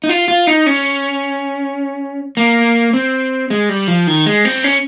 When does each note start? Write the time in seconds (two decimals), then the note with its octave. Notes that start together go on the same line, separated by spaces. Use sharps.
0.04 D#4
0.09 F4
0.28 F4
0.47 D#4
0.66 C#4
2.37 A#3
2.93 C4
3.50 G#3
3.69 G3
3.88 F3
4.07 D#3
4.26 G#3
4.45 C4
4.64 C#4